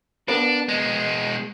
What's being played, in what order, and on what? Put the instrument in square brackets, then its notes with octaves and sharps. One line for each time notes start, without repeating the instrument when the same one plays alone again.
[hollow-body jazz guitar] B3 A#4 B4 [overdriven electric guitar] D4
[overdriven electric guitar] B2 G#3